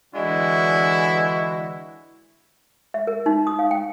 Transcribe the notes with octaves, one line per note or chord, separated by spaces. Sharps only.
D3 E3 G#3 D4 E4 F#4
E5
A#4
D#4
D#6
F5
G5